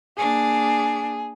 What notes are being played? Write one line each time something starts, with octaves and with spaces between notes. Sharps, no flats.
A#3 D4 G#4